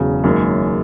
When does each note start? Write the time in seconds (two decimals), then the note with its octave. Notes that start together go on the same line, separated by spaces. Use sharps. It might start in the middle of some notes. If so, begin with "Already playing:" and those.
Already playing: E1 E2 C#3 F#3
0.24 F#1 F#2 D#3 G#3